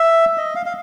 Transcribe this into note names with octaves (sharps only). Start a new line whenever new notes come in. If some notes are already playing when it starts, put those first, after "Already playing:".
Already playing: E5
D#5
F5
F5